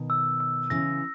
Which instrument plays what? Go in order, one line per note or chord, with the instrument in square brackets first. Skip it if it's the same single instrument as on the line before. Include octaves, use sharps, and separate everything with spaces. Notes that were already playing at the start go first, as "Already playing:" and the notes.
Already playing: [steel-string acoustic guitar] B2 D#3
[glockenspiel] E6
E6
[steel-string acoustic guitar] C#3 E3 [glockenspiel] A#6